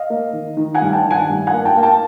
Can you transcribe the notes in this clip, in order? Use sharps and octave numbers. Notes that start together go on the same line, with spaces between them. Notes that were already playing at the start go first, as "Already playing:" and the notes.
Already playing: D#5 F5
A#3
D#3
D#3
F#5 G#5
G2
G5 A5
D#3
F#5 G#5
G2
F#5 G#5
A#3
G5 A5
A#3
G5 A5